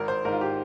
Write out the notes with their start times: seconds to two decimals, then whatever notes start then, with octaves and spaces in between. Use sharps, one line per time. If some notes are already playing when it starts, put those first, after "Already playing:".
Already playing: G#1 A#4
0.08 C5
0.25 G#2 D#3 A#4
0.33 F4
0.41 G4